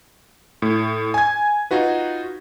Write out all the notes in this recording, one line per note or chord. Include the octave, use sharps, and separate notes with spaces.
A2
G#5 G#6
D#4 F4 F#4 B4